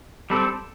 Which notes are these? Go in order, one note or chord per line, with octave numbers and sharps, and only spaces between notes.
G3 C4 A4